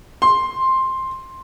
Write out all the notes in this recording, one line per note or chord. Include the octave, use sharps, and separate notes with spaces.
C6